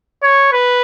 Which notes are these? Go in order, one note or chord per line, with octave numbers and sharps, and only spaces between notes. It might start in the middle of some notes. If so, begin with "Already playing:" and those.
C#5
B4